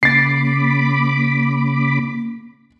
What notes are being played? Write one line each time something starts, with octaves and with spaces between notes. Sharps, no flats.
C#3 A#3 B5 D6 A6 C7